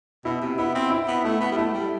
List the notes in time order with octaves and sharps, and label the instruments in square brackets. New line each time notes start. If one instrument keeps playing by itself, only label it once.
[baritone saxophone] B2 [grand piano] E4
[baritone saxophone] C3
[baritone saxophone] B3 [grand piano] E4
[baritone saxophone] C4
[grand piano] E4
[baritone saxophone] B3
[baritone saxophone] A3 [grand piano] E4
[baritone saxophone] B3
G3
[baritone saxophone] A3 [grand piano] E4
[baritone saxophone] G3